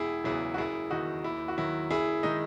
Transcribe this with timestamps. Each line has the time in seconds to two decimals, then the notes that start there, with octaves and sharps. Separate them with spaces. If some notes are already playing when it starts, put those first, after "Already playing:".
Already playing: E1 E4 G#4
0.24 E2 C#3 F#3 E4 G#4
0.54 F#4
0.58 F#1 E4 G#4
0.90 E2 D#3 D#4 F#4
1.24 D#2 E4
1.48 F#4
1.58 D#3 F#3 E4
1.91 F#1 E4 G#4
2.23 D#3 G#3 D#4